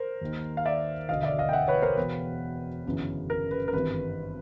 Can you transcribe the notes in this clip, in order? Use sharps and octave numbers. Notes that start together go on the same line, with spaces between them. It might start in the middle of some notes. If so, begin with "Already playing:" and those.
Already playing: A#4 C5
D#2 D#3
F5
D5 E5
E1 D2 D3 D#5 F5
D5 E5
D#5 F5
G5
E5 F#5
B4 C#5
A#4 C5
E1 E2 B2 B4
G1 F#2 C#3 E3
A#4
B4
A#4
G#1 G2 E3 B4